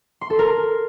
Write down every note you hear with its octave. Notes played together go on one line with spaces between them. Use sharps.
C6
A4
A#4